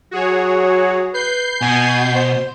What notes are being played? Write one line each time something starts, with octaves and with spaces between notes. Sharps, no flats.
F#3 F#4 G#4 C#5
B4 G6 C7
B2 G#5
C5